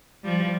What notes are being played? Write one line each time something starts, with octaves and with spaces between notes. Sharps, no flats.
F3 G3